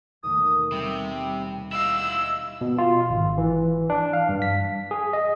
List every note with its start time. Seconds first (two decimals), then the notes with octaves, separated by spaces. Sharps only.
0.23 D#2 B2 A3 D#6
0.72 C3 G3 B5
1.72 E4 D#5 F5 E6
2.61 B2
2.78 F4
3.10 G#1
3.38 E3
3.90 D4
4.13 F5
4.29 G2
4.42 B6
4.91 G#4
5.13 D#5